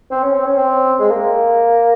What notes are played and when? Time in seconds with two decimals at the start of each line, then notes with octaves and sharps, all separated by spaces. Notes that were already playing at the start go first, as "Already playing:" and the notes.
0.11 C4
0.23 C#4
0.34 C4
0.46 C#4
0.57 C4
0.99 G#3
1.10 A#3